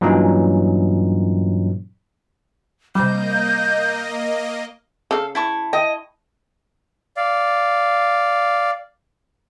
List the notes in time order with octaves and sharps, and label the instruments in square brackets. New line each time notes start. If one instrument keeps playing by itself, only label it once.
[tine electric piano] G2 A#2 E3 F#3 C#4 D#4
[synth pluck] C3 G3 [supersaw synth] A#3 D#5 [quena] G6
[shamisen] C#3 [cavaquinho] A4 F5
[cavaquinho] E4 A5 C#6
[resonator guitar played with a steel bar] D#5 [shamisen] G5
[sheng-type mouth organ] D5 F5